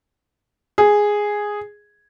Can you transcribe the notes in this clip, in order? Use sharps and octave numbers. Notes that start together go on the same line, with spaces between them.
G#4